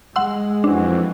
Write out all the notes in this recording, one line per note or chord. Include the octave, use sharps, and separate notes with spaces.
G#3 F#5 C6 E6
F2 E3 C4 D4 F#4